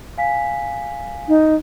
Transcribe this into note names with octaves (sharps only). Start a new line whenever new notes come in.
F5 G#5 B6
D#4